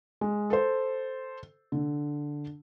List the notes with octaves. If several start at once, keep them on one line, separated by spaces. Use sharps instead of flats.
G#3
A4 C5
D3